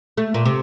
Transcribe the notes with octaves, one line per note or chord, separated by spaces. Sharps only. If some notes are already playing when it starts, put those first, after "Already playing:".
A3
A#2
C3